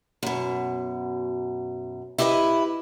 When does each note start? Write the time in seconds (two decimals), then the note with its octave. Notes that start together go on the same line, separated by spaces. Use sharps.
0.23 F#2 B2
2.18 E4 G4 B4 C5 D#5